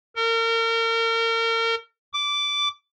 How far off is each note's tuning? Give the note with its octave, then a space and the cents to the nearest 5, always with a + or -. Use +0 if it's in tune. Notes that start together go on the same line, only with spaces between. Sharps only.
A#4 -35
D6 -10